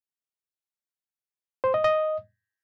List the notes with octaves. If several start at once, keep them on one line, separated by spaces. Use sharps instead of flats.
C5
D#5
D#5